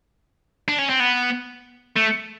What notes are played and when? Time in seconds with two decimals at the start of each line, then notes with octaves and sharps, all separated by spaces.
0.68 D4
0.78 C#4
0.89 C4
1.00 B3
1.96 A3